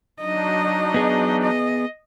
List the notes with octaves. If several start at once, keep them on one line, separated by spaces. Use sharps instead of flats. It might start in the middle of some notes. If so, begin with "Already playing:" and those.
F#3 D4 D#4 D#5
B3 G#4
D#5